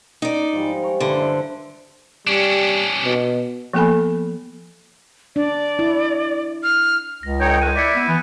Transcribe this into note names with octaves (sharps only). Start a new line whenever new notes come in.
D#4 D5
G#2 F3 G3
A#5 C#6
G2 D3 E4 C5
D5 E5
G3 C#4 D4
B2
F3 A#3 B3 A4 G#5 B5
D4 D5
E4
F6
C#2 A#6
D3 D#4 C#5 G5
D#3 G#3 A3 F#6 G6 D#7
E4 D5 E5 A#6 B6 C#7
B3 E6 D#7
E3 B3